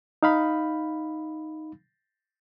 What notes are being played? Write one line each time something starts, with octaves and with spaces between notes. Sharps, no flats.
D#4 F5 B5